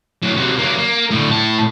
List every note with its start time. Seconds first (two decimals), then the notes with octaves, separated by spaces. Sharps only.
0.22 A2 F#3
0.36 C3 F#3
0.58 F#3 A#3
0.78 A#3
1.11 A2 D3
1.30 A2 A5